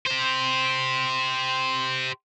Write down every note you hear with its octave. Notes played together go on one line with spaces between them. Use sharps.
G4 C5